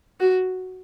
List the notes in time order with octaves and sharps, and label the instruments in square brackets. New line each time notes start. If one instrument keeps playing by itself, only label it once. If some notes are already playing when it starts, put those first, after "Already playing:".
[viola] F#4